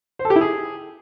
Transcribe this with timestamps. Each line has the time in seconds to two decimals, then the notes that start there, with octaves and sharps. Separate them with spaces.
0.19 C5
0.25 A4
0.30 G4
0.36 E4
0.41 G#4